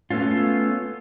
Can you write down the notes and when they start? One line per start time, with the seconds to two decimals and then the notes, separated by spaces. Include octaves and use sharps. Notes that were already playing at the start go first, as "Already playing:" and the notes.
0.11 A3 B3 C#4 F4